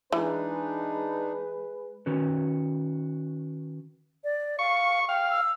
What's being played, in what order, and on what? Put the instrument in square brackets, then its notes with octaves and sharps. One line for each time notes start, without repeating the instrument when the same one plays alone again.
[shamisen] E3 [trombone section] G#3 G#4 B4 [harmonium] D4 D#4
[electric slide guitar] D#3 C#4 F#4 B4
[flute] D5
[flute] F5 [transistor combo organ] C#6
[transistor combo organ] F5 [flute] G5
[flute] E6